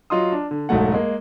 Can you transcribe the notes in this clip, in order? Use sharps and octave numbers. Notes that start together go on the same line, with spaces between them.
F#3 F4 D#5 C6 D#6
D4
D3
E1 G#2 F#3 A3 F#5
G#3 A#3